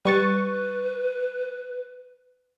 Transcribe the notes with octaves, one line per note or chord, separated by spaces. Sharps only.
G3 B4 C#6 A6